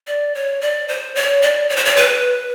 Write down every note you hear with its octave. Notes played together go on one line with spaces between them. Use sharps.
D5
C#5
D5
C5
C#5
D5
C#5
C5
C#5
B4